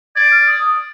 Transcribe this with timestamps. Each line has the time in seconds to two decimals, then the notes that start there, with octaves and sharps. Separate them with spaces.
0.16 D5 G#6
0.32 F6
0.48 D#6